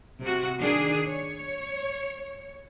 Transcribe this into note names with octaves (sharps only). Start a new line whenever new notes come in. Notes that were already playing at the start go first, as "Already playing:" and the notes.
C3 F#4
D#3 D4 G#4
C#5